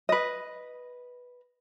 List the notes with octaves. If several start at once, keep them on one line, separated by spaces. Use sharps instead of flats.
B4 D#5